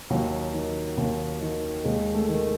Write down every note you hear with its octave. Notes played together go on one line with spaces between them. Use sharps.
D#2 F#3
D#3
D#2
D#3
D#2 G#3
A3
D#3